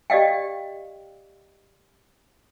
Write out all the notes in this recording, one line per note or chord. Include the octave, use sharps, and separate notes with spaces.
G4 D5 D#5 F5 G5